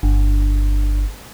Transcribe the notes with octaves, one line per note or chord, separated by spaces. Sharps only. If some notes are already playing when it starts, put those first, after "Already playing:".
G1